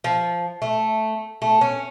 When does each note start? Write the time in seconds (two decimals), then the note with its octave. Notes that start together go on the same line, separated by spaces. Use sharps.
0.04 F3
0.62 A3
1.42 A3
1.61 C#4